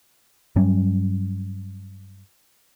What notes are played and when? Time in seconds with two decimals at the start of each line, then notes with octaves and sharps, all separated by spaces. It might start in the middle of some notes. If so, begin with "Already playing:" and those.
0.56 G2 F#3 G3 C#4